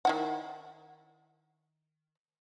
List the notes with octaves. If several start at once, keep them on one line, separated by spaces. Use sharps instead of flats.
D#3 E4 F#5